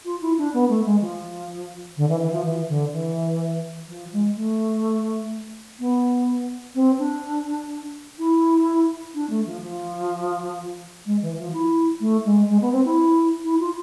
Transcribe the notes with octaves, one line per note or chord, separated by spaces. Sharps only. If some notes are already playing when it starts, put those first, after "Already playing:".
F4
E4
D4
B3
A3
G#3
F3
D3
E3
E3
F3
E3
D3
E3
F3
G#3
A3
B3
C4
D4
E4
D4
A3
F3
F3
G#3
E3
F3
E4
A3
G#3
G#3
B3
C4
E4
E4
F4